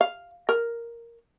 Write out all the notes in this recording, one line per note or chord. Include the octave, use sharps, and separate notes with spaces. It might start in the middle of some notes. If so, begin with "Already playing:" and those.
F5
A#4